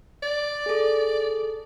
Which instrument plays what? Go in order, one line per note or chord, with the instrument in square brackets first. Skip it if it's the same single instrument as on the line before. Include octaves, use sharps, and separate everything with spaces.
[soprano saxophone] D5
[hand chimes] G#4 A4